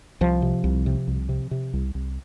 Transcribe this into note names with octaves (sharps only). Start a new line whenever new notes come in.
C2 F3
C3
C2
C3
C2
C3
C3
C2
C2